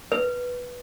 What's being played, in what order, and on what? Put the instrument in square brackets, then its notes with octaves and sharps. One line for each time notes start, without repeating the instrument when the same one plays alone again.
[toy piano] B4